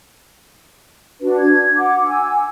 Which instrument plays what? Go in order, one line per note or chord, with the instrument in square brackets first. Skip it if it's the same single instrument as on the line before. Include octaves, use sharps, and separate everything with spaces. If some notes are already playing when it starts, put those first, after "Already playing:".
[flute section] D4 F#4 B4
G#6
F#5 D6
G#5 E6